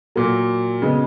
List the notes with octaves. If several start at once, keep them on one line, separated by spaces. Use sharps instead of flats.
A#2 F#3 A#3
C#3 G#3 B3